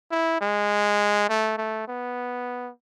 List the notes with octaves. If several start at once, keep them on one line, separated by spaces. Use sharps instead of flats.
E4
G#3
A3
A3
B3